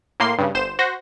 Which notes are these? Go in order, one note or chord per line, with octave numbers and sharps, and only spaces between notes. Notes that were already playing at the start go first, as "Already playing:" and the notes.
A2 A#3 C6 C7
G2 C#3
G1 C5 E7
F#4 C5 A#6